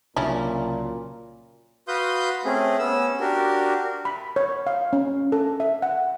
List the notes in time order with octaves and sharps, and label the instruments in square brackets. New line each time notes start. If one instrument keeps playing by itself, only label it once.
[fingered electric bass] C2 C#3 F#3 [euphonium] A#2 [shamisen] C#4 D4 E4
[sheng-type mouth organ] F#4 B4 F5 C6 D#6 G6
A3 C4 C#4 G#4
B3 C#4 E6
D4 F#4 G4 A#4
[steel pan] B5
C#5
F5
C#4
A4
E5
F#5